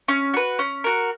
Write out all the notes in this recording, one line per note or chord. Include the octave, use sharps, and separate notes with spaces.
C#4
F#4 B4
C#4
F#4 A#4